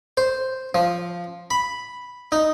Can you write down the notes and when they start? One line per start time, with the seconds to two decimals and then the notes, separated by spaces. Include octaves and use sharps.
0.17 C5
0.74 F3
1.51 B5
2.32 D#4